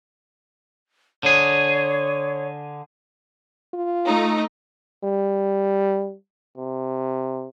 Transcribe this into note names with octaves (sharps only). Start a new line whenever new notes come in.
D3 G#4 C#5
F4
A3 D#4
G3
C3